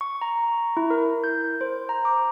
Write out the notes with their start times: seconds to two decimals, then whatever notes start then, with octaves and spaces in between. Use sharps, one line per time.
0.01 C#6
0.21 A#5
0.77 E4
0.90 A#4
1.24 G6
1.61 C5
1.89 A#5
2.05 D6